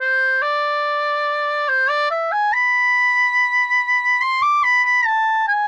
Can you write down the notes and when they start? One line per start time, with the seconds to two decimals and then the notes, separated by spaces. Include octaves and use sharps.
0.01 C5
0.42 D5
1.69 C5
1.90 D5
2.11 E5
2.32 G#5
2.53 B5
4.21 C6
4.43 D6
4.64 B5
4.84 B5
5.06 A5
5.48 G#5